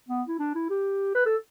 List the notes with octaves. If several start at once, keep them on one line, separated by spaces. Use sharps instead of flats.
B3
E4
D4
E4
G4
B4
A4